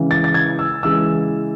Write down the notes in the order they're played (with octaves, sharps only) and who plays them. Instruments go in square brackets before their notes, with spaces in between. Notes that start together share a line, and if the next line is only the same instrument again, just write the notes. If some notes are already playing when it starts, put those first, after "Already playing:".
Already playing: [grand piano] C#3 E3 G#3
A6
A6
G#6
E6
C#3 E3 G#3 E6